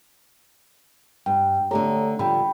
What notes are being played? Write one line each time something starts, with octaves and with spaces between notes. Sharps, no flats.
G2 G5
D3 A3 G4 A4 C#5 A#5
D3 F3 G3 G5 B5